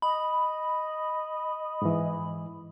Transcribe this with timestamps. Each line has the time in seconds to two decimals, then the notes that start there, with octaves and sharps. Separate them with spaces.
0.02 D#5 B5
1.82 G#2 E3